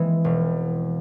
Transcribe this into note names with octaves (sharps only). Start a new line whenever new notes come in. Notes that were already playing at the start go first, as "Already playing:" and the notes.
Already playing: E3 G#3 A#3 C4
E1